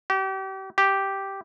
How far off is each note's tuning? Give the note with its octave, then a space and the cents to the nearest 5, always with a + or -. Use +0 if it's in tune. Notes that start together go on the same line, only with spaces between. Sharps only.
G4 -35
G4 -5